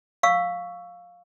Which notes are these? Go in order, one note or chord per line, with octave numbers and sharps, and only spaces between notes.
F5 C#6 E6